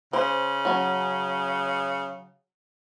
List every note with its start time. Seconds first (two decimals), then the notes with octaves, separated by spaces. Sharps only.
0.13 C#3 C5
0.65 F#3 C#4